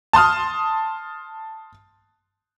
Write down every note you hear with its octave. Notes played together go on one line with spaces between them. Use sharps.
A5 C6 D#6 F6